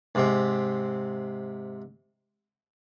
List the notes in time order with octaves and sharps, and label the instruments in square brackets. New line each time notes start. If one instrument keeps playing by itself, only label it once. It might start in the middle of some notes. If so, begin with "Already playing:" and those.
[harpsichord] G#2 C3 C4